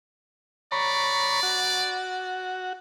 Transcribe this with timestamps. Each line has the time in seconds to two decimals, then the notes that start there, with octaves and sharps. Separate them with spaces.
0.72 C#5 D5 A#5 B5
1.43 F#4